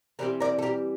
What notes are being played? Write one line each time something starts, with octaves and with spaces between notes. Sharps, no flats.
E3 G3 C4 A#4 D5
A#4 D5
A4
G4 A#4